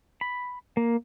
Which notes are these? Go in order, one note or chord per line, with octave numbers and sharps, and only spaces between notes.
B5
A#3